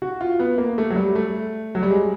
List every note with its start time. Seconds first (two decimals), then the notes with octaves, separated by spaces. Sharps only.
0.02 F#4
0.21 F4
0.40 B3
0.58 A#3
0.78 A3
0.90 F#3
0.96 G3
1.15 A3
1.75 F#3
1.83 G3
1.90 G#3